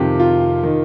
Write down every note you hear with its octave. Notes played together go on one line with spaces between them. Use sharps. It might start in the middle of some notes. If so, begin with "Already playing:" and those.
Already playing: F2 C3 D#3 G4
F4
D#3